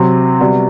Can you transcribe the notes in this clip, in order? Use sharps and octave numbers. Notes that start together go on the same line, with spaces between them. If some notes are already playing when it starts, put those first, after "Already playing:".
Already playing: C3 F#3 C4
C3 G3 B3 F#4